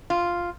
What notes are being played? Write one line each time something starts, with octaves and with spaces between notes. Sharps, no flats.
F4